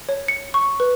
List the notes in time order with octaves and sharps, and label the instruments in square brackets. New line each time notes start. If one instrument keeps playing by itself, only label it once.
[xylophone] C#5
C#7
C#6
B4